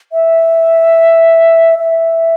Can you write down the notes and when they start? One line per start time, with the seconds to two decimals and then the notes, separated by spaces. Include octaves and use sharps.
0.12 E5
1.79 E5